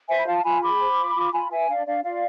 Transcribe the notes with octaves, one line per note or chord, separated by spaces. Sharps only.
C5 E5 G#5
B5
F4 F5 A5
F4 G#5 B5
G#4 B5 D6
C5
F4
F4
F4 G#5 B5
B4 E5 G#5
D4 D5 F5
D4 D5 F5
F4 D5 F5